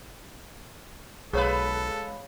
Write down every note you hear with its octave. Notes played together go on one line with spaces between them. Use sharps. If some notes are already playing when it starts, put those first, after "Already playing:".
B1 G#3 G#4 A4 B4 C#5 F5